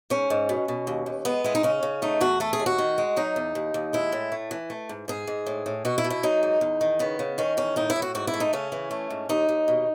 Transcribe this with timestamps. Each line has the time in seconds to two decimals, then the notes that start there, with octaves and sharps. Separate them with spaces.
0.10 G#2 C#4
0.30 G#2
0.49 B2
0.68 B2
0.87 D#2
1.06 D#2
1.25 G#3 B3
1.44 G#3 E4
1.55 D#4
1.63 C#3 C#4
1.83 C#3
2.02 A3 D#4
2.21 E2 F#4
2.40 A3 A4
2.53 G#4
2.60 D#2
2.66 F#4
2.78 D#3
2.98 G#3
3.16 F#3 D#4
3.36 E2
3.55 D#2
3.74 D#2
3.93 G#3 E4
4.12 A2
4.32 A3
4.51 E3
4.70 A3
4.89 G#2
5.08 G#2 G#4
5.27 G#2
5.46 A2
5.66 A2
5.85 B2 F#4
5.98 E4
6.04 B2
6.10 E4
6.23 F#3 D#4
6.43 G#2
6.61 E2
6.81 D#3
6.99 C#3 B3
7.19 C#3
7.38 D#3 C#4
7.57 E2 C#4
7.76 A2 D#4
7.90 E4
7.96 A2
8.02 F#4
8.15 G#2 F#4
8.27 E4
8.34 A3
8.40 D#4
8.53 C#3 C#4
8.72 E3
8.91 A3
9.10 G#2
9.29 D#2 D#4
9.49 D#2
9.68 B2